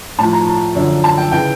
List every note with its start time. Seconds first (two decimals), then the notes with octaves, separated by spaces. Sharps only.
0.19 A2 F3 A5
0.33 A#5
0.47 A#5
0.75 F#2 D3 F3
1.04 A5
1.17 G5
1.32 C#3 E3 G5